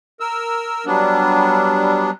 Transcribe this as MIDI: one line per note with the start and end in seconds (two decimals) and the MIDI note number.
0.20 0.85 70
0.20 0.85 88
0.86 2.11 54
0.86 2.11 55
0.86 2.11 59
0.86 2.11 62